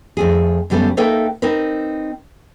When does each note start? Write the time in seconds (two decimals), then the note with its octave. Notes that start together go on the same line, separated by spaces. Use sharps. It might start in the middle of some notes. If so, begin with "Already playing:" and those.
0.17 F2 A3 G#4
0.70 F#2 D3 G3 A3 B3
0.97 A#3 D#4 A4 B4 E5 G5
1.42 C4 D#4 A#4 B4